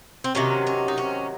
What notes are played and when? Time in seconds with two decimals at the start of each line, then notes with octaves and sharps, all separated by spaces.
0.24 C4
0.35 C3 D#3 F#3 C#4
0.67 C#4
0.88 D#4
0.98 C#4